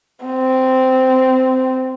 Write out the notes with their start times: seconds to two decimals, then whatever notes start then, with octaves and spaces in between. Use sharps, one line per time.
0.25 C4